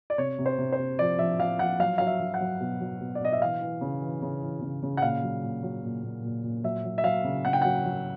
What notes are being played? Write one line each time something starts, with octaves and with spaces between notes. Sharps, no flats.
D5
C3 C#5
C3
C5
C3
C5
C3
F3 D5
F3 E5
F3 F5
F3 F#5
F#3 F5
F#3 F5
E5
F#3
F#5
F#3
B2
F#3
B2
D5
B2 D#5
E5
E3 F5
E3
C#3
E3
C#3
E3
C#3
C#3
F#5
A#2 F5
F#3
A#2
F#3
A#2
A#2
A#2
A#2
F#3 E5
F#3
E5
F#3 F5
C#3
C#3 F#5
G5
F#3 F#5
F#3